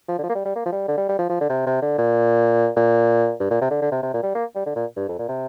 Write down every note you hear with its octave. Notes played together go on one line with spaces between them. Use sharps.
F3
D3
F3
A#3
G3
G3
A#3
F3
G3
D3
G3
G3
F3
F3
D3
C3
C3
D3
A#2
A#2
G2
A#2
C3
D3
D3
C3
C3
A#2
G3
A#3
G3
D3
A#2
G2
F2
A#2
C3